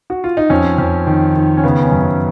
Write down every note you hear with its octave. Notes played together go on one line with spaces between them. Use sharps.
F#4
F4
D#4
F2 C#4
F2
D#3
D#3
C#4
C#3 B3
C#4
F#2
C#4